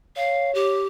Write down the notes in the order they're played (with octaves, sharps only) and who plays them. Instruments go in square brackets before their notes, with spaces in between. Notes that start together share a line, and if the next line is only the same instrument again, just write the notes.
[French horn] C#5 [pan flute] F5
[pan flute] G4